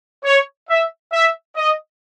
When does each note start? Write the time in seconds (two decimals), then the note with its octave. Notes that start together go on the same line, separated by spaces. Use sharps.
0.24 C#5
0.68 E5
1.13 E5
1.57 D#5